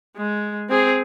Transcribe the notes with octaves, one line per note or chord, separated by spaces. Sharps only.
G#3
C4 G#4